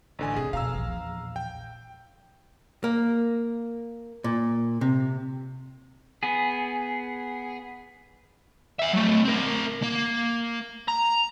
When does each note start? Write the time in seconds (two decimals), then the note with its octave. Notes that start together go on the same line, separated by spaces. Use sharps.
0.19 A1 D3 G#5
0.36 C3 G#4
0.53 F2 B2 F5 A#5 E6
0.73 A#1 E2
1.36 G5
2.84 A#3
4.24 A#2
4.81 C3
6.23 B3 G#4
8.79 E5 F#5
8.93 F#3 A3
9.24 C4 A#4
9.82 A#3
10.88 A#5